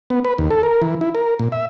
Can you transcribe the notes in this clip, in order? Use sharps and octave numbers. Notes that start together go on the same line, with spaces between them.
B3
B4
D#2
A4
A#4
E3
E4
A#4
A#2
E5